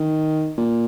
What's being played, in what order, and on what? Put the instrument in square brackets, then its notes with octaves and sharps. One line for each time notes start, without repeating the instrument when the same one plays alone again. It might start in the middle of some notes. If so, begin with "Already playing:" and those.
Already playing: [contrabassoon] D#3
A#2